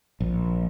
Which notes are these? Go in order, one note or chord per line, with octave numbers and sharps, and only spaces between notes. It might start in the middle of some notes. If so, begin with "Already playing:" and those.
A#1